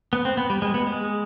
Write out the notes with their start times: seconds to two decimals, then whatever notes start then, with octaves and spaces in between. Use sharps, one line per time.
0.13 B3
0.25 C4
0.37 B3
0.50 G3
0.62 G#3
0.74 B3
0.87 G#3